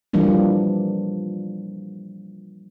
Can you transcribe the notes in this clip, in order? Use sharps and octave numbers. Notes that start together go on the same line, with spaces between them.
E3 F3 G3 A#3 D4